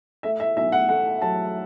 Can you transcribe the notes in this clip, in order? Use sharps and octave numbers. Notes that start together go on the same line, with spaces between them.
A3 E5
E5
B1 E5
F#5
A3 F#5
F#3 A5